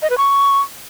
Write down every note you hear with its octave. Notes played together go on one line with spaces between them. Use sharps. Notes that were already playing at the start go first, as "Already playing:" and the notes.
D#5
B4
C#6